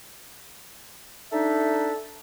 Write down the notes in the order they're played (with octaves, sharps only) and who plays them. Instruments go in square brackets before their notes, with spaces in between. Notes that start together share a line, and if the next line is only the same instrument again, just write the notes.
[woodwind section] D4 D#4 E5 [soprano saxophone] A4